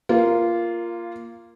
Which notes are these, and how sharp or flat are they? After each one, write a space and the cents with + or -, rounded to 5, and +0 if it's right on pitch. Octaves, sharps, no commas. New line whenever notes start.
A#3 +0 F4 -15